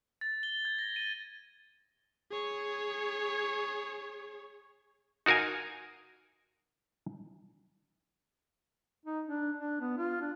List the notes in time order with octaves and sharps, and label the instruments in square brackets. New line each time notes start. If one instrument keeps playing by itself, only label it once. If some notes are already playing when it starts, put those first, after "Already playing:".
[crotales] A6
G7
G#6
A#6
D#7
[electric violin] G#4 C#5
[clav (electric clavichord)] D#4 F#4 A#4 F5 G#5
[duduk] D#4
D4
D4
B3
F4
D4